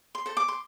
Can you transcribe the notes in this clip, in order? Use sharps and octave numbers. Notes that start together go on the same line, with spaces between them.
C6
A4 C5
D6
C6